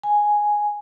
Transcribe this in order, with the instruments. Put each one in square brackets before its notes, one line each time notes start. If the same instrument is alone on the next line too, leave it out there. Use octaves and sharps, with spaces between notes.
[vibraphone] G#5